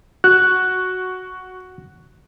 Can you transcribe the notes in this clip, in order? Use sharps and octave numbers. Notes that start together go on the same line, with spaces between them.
F#4 F#6